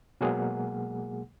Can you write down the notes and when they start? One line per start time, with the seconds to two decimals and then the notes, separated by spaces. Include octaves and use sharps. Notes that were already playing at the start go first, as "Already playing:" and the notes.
0.21 B2 F#3 G#3 A#3 G#4 F#5